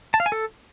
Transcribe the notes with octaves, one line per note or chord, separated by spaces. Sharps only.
A5
F5
G#5
A4